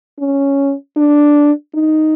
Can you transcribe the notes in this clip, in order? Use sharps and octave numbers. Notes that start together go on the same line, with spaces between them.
C#4
D4
D#4